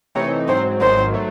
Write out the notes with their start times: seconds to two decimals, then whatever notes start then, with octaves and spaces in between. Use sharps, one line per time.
0.15 C3 E3 A3 C4 D#4 C#5
0.48 G#2 F#3 C4 C5
0.81 G#1 G#2 D#3 F#3 C5
1.14 F#3 A3